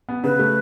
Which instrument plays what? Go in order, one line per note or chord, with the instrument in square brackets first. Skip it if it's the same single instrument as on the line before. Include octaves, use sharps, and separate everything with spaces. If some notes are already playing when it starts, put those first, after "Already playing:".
[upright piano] B3
[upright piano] C#3 [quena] B4
[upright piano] A3